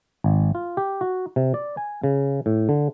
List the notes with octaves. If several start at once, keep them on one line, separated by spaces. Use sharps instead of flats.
G#1
F4
G4
F#4
C3
D5
G#5
C#3
A2
D3